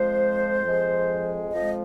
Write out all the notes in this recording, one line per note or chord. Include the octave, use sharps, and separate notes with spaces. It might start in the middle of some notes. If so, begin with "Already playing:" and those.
Already playing: F2 F3 G#3 C5
F2 F3 G#3
F2 F3 G#3 D#5